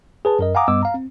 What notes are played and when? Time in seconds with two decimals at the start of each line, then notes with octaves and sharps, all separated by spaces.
0.25 G#4 B4 A5
0.39 F#2 A#4 D#5
0.55 F5 F#5 G#5 A#5 D6 D#6
0.68 G2 G3 B3 D#5 D6 E6
0.83 F5 A#5
0.94 C4